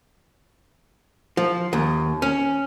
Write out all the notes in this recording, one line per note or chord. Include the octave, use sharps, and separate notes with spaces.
F3
D#2
C#4